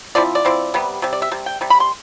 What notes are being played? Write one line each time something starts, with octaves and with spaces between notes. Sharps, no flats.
F3 C4 E4 D5
D5
F3 C4 E4
C3 G3 B3
C3 G3
D5
E5
C3 G3
G5
C3 G3
B5
C6